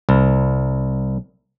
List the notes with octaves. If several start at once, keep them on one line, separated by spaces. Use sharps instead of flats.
C2